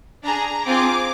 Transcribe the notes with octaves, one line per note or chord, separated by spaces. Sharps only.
D4 G#4 A#5
C4 F4 G#4 D6